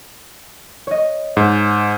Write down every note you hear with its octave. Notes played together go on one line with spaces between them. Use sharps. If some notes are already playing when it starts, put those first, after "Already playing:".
C#5 D#5
G#2